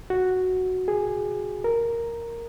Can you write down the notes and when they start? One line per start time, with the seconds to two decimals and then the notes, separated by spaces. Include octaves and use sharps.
0.10 F#4
0.88 G#4
1.64 A#4